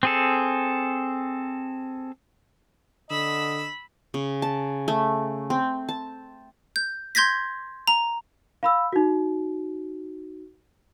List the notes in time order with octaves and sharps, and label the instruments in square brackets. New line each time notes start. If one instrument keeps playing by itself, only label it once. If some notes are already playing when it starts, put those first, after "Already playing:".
[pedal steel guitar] C4 G#4 A4
[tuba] D3 [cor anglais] D#5 [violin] B5 E6
[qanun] C#3
A5
A3
C4
A5
[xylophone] G6
C6 G6 G#6 A#6 B6
A#5
[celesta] F5 B5 E6
D#4 F#4